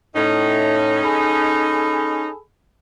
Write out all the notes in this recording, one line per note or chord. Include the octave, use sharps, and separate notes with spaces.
A2 C#4 D#4
G#4 A4 B5